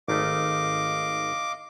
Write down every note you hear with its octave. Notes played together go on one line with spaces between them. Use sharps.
G#1 D#3 A3 D#5 F5 D6